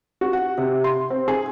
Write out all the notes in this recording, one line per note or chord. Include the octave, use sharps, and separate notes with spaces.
F#4
F#5
C3
C6
C4
G#4